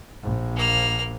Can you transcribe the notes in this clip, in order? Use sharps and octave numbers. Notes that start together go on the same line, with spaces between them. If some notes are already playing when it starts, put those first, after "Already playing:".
A#1
A#3 F6